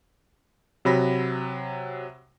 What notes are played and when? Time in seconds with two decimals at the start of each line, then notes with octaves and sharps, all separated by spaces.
0.85 C3 F#3 B5 A#6